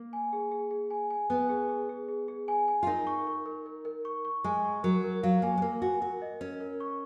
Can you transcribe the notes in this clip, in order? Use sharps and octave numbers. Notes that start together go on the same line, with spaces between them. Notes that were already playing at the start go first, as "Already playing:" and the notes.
Already playing: A#3
G#5
G#4
G#4
G#4
G#5
G#5
B3 G#5
G#4
G#4
G#4
G#4
G#4
G#5
G#5
F4
D#4 A#4
C#6
A#4
A#4
A#4
A#4
C#6
C#6
G#3 G#5
C#6
F#3 A#4
A#4
F#3 F5
A#3 G#5
G#3
A#3 A#4
F#4 G#5
F#4 A#4
D#5
C#4 A#4
A#4
C#6